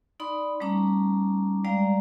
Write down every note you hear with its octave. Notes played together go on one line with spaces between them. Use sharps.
D#4 D5 B5 C6 D#6
G3 A3 C#4 D#4 A#5 D6
G3 G#3 D5 F5 G5 A#5